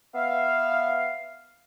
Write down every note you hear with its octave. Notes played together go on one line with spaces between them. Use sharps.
B3 E5 F5